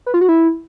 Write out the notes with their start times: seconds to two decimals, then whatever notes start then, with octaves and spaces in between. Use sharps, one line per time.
0.06 B4
0.14 F4
0.21 F#4
0.29 E4